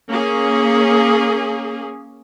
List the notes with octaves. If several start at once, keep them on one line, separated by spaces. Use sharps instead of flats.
A#3 C#4 G#4